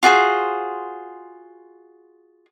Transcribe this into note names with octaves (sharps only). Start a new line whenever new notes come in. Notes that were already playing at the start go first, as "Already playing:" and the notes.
F4 F#4 G#4 C5